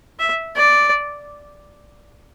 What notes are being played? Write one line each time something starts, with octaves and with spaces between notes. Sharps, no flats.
E5
D5